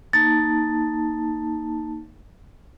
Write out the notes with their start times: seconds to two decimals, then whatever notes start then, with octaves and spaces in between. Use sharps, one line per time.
0.13 A#3 D#4 A5 A6